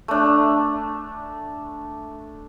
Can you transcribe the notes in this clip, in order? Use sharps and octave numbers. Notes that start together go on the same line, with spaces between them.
A3 D4